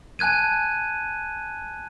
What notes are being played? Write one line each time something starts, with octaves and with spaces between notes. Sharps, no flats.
G#5 A5 F#6 G#6 D#7